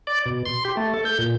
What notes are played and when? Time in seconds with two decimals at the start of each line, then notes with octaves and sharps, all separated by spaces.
0.07 D5
0.26 B2
0.46 C6
0.65 G4
0.77 A3
0.94 A4
1.05 G6
1.18 A#2